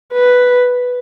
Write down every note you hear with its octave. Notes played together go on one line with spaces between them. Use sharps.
B4